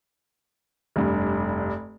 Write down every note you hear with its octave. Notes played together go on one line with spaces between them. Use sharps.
F1 G2